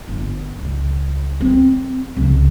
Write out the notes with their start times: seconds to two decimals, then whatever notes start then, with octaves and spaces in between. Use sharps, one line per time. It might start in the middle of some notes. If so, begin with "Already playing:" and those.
0.08 G1
0.59 C#2
1.41 C4
2.17 C#2 C#3